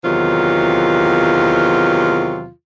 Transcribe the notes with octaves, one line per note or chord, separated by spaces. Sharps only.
E2 C3 D#3 F#3 F4